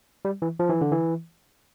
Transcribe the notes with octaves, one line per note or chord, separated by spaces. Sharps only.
G3
E3
F3
E3
D3
E3